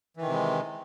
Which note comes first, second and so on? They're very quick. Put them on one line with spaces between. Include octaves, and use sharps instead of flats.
E3 D#3 C3 G#3